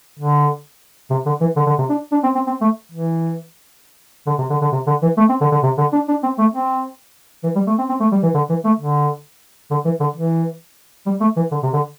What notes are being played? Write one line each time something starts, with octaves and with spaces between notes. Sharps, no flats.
D3
C3
D3
E3
D3
D3
C3
D4
D4
C4
C4
C4
A3
E3
D3
C3
D3
D3
C3
D3
E3
A3
C4
D3
D3
C3
D3
D4
D4
C4
A3
C4
E3
G3
A3
C4
C4
A3
G3
E3
D3
E3
A3
D3
D3
E3
D3
E3
G3
A3
E3
D3
C3
D3